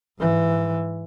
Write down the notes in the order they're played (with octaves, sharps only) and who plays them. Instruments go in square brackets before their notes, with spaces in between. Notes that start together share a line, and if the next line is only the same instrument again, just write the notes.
[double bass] G#2 E3